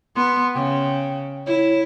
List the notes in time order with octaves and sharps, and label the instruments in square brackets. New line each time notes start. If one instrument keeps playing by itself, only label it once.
[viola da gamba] B3 [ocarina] C6
[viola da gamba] C#3 [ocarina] G5
[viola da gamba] E4 [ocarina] C#5